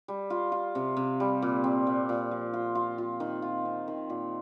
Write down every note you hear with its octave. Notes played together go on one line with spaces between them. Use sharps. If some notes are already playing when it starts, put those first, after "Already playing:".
G3
F4
F4
C3
C3
G3
A#2
C4
A#2
A#2
F3
F4
F4
F4
D#3
F4
C4
D#3
A#2